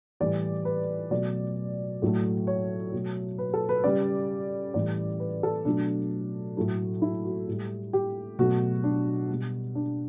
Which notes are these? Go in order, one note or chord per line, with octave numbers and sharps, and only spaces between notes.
A2 E3 G3 D5
B4
B2 F#3 A3 D5
A2 F#3 A3
C#5
B2 F#3 A3
B4
A4
B4
C#3 G3 D5
A2 E3 G3 D5
B4
A4
B2 F#3 A3 D4
A2 F#3 A3
E4
F#4
A2 G3
G4
B2 F#3 A3 F#4
D4
B2 G3
D4